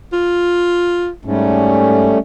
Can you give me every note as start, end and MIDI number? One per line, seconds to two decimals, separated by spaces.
0.13 1.10 65
1.25 2.12 44
1.25 2.18 55
1.25 2.18 57
1.25 2.18 61